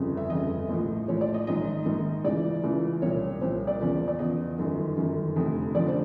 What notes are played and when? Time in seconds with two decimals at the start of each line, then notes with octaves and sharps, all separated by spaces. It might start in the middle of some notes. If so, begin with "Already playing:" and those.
Already playing: G1 F2 C#3
0.17 E5
0.30 G1 F2 C#3 D#5
0.69 A#1 A2 F3
1.08 A#1 A2 F3 C#5
1.21 D5
1.34 D#5
1.47 A#1 G#2 D#3 D#5
1.85 A#1 G#2 D#3
2.24 C#2 C#3 E3 D5
2.63 C#2 C#3 E3
3.02 C2 A#2 F3 C#5
3.41 C2 A#2 F3 C5
3.67 D5
3.81 E2 C#3 F3
4.08 D5
4.19 E2 C#3 F3 D#5
4.58 G1 F#2 D#3
4.97 G1 F#2 D#3
5.36 F1 F2 D3 F3
5.75 F1 F2 D3 F3 D5
5.88 C5